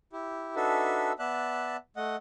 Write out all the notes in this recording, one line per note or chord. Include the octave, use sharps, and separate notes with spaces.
E4 G4
D4 D#4 F#4 A4 B4 E5
B3 D5 E5 A5 F#6
A3 D#5 F#5